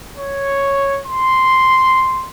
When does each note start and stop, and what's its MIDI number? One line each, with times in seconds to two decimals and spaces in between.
0.18 1.00 73
1.06 2.30 84